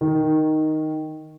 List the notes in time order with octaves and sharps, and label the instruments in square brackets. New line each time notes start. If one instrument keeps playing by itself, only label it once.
[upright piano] D#3